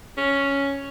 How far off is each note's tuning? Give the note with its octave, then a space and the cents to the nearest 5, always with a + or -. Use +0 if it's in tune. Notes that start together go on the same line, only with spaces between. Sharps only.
C#4 +5